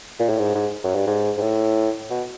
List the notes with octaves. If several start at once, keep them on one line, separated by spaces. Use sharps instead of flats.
A#2
A2
G#2
G#2
F#2
G2
G#2
G#2
A2
B2